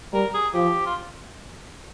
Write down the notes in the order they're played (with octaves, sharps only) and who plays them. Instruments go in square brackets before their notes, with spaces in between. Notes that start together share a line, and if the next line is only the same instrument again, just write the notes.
[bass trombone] G3 [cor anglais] A#4
[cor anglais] G#4
[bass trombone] F3 [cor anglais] G4
[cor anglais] F4